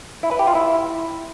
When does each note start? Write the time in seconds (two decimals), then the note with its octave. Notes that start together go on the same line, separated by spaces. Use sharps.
0.23 E4
0.31 B4
0.39 G4
0.47 F4
0.55 E4